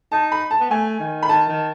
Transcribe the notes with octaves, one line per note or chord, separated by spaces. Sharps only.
D#4 A5
B5
A5
B3
A3 G#5
D#3
B5
D#3 A5
D#3